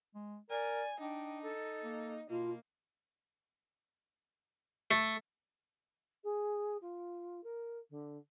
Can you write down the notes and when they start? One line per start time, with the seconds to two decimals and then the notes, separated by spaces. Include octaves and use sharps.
0.15 G#3
0.50 A#4 D5 G#5
1.00 D4 D#4 G5
1.42 A4
1.83 A#3
2.30 B2 A#3 F4
4.91 A3
6.24 G#4
6.81 F4
7.43 A#4
7.90 D3